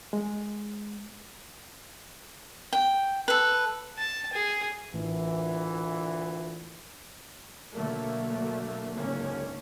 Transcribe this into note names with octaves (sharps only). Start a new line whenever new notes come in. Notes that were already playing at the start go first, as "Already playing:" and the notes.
G#3
G5
A4 B4
A5
G#4
A1 D2 A#2 E3
B2 D3 F#3 A3 A#3
F#1 C#2 G#2 D3 A#3 C#4